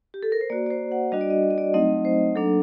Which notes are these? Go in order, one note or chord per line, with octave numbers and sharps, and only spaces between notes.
G4
A4
A#4
C5
A#3 F#4 D5
D5
C5
F#5
G3 D4 F#4 D#5
D5
D#5
D5
D#5
D5
F#3 A3 C4 D#4 D#5
C5
F#3 A#3 D4 A4